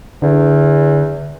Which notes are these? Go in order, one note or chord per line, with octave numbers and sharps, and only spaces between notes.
E2 D3